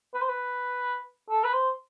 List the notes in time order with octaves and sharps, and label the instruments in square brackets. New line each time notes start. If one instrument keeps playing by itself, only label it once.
[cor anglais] B4
C5
B4
A4
B4
C5